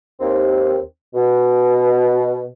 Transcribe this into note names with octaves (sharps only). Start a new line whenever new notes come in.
D#2 C4
B2